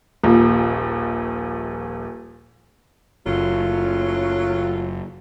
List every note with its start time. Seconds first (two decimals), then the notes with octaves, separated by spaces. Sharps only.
0.24 D#1 A#1 A#2
3.27 F#1 F#3 A3 F4